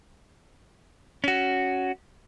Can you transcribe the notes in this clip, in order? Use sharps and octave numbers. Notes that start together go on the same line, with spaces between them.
C#4 F#4